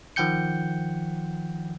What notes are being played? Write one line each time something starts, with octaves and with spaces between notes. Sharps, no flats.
D#3 F3 F#5 G5 G6 C#7